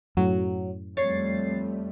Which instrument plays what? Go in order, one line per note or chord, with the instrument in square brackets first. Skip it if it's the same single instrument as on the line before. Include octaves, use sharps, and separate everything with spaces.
[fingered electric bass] F#2 A2 [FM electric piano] F#3
[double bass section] F2 G3 A3 [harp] C#5 [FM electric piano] A6 C7